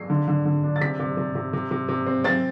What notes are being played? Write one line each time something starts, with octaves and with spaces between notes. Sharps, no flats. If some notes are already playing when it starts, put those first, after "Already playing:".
Already playing: C7
D3
D3
D3
D4
A6
C3 B6
C3
C3
C3
C3
C3
C3
C4
C4 A6